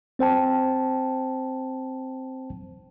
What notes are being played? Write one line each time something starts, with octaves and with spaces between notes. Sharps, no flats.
C4 C5 G5 A5